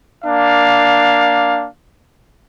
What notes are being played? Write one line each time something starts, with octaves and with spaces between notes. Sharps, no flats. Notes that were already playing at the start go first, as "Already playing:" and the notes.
A#3 D4 F5